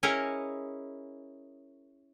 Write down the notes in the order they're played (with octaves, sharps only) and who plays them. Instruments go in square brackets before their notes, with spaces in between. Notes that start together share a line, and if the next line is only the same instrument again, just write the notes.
[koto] C#4 E4 G#4 A#4 C#5 D#5